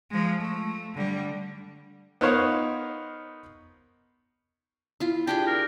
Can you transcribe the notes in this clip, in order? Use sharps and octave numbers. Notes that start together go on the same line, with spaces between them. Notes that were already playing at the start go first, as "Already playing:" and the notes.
F3 G#3
A3
D3 G3
B3 D#4 A#4 C5 C#5 F5
E4 F4
D4 G4 G#4 G5
A#4